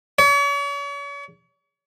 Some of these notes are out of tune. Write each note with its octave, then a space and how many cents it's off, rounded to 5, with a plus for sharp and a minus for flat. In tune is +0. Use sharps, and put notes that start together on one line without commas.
C#5 +40